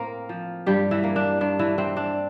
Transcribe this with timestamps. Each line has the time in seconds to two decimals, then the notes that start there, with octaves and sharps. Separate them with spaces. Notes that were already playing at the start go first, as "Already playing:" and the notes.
Already playing: A2 A#3 C4 A#4
0.29 F3
0.66 G2 G3 G4
0.91 E3 E4
1.04 A#3
1.16 D4
1.41 G2 D4
1.59 E3 E4
1.78 E3 C4
1.97 D4